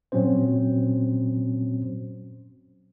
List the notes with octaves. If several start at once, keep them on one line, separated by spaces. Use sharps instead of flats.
A#2 F#3 C4 C#4 C5